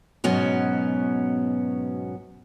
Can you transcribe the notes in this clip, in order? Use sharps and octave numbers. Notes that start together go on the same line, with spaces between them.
G#2 B2 F#3 B3 C#4